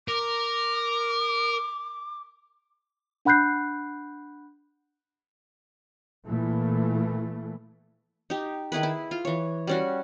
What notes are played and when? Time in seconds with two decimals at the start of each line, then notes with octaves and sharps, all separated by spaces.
0.08 A#4 D6
3.25 D4 F#5 B5 F#6 G6 C7
6.27 A#2 E3 A3
8.30 D#4 G4
8.72 D#3 E4 G#4 B4
8.83 E4
9.11 F4
9.25 E3 C#5
9.67 G3 C#4 F#4